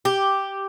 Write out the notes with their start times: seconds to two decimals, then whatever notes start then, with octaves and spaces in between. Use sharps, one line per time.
0.05 G4